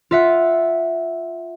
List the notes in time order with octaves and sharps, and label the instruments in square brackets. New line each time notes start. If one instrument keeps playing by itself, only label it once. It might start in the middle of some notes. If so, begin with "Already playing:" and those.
[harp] F4 E5 F#5